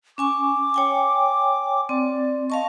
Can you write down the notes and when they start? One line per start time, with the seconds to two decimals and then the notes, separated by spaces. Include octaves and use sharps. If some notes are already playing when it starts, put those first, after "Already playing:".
0.18 C#4 G#5 C#6 D6
0.74 C#5 G5 G#5
1.89 C4 D5
2.50 D#5 F5 A5 C#6